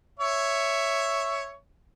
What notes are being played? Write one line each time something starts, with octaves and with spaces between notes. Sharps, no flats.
C#5 E5